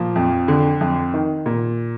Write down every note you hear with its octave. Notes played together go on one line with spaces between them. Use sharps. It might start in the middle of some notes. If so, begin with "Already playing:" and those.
Already playing: A#2 F3
F2
D3
F2
D#3
A#2